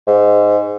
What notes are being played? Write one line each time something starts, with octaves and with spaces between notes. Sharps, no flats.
G#2